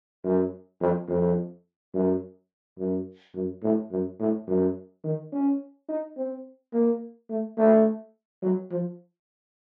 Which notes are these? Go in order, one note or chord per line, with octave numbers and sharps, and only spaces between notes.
F#2
F2
F2
F#2
F#2
F#2
A2
F#2
A2
F#2
D#3
C#4
D#4
C4
A#3
A3
A3
F#3
F3